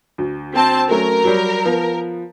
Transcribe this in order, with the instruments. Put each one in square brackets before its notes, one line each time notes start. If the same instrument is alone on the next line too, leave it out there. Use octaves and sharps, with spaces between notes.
[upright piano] D2
[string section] C4 A5
[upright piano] F#3 A3 C#4 [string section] A#4
[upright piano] F#3 G3
F3 B3